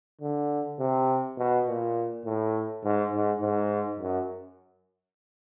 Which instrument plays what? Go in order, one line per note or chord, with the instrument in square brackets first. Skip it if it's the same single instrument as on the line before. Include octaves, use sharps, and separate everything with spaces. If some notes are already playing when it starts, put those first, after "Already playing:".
[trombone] D3
C3
B2
A#2
A2
G#2
G#2
G#2
F#2